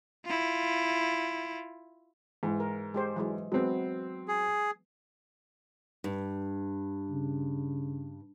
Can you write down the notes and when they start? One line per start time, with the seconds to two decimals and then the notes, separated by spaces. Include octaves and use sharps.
0.25 E4 F4
2.43 G#2 E3
2.60 A#4
2.94 G#3 G4 C5
3.16 E3 F#3 G#3
3.52 F#3 G#3 B3 C4
4.28 G#4
6.04 G2
7.10 C#3